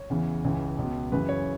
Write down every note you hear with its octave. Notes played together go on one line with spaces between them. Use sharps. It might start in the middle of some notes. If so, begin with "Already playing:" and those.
Already playing: C#5
E2 C#3 E3
C#2 C#3 E3
C#2 B2
F#2 C#3 E3 B4
C#5